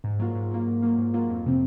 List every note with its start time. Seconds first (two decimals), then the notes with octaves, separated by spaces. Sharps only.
0.04 G#2
0.19 F#3 A#3 F4
0.35 G#2
0.51 F#3 A#3 F4
0.67 G#2
0.82 F#3 A#3 F4
0.98 G#2
1.14 F#3 A#3 F4
1.29 F2
1.46 C3 F3 C4